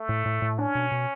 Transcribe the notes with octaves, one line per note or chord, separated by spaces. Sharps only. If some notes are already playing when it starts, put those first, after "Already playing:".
Already playing: A3
A2
A2
A2
C#4 D4
B2
B2